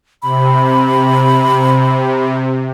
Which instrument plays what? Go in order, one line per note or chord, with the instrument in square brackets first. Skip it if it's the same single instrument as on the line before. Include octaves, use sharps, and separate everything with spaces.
[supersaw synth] C3 [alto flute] B5